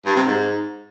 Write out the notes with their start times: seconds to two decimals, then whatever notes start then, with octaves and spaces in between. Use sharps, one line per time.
0.06 G2
0.16 C3
0.25 G#2